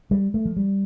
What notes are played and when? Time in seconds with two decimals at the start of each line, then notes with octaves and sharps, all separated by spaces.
0.11 G3
0.34 A3
0.45 F3
0.57 G3